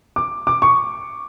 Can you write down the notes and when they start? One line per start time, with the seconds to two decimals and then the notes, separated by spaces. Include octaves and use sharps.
0.16 D6
0.47 D6
0.62 C#6